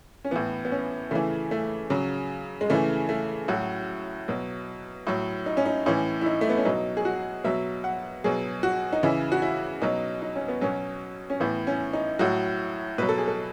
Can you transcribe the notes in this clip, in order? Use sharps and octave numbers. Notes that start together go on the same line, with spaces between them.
C#4
A2 E3 B3
B3
C#4
C#3 E3 A3
A3
C#3 F#3
G#3
C#3 E3 A3
A3
A2 F#3 F#4
B2 F#3
A2 F#3
D#4
C#4
D#4
A2 E3 C#4
E4
D#4
A3
B3
C#4
B2 F#3 D#4
G#4
F#4
B2 F#3 E5
F#5
B2 F#3 G#4
F#4
D#4
C#3 E3 E4
F#4
E4
B2 F#3 D#4
D#4
C#4
B3
B2 F#3 C#4
C#4
A2 E3 B3
C#4
D#4
A2 F#3 F#4
B2 F#3 B4
A4
G#4
A4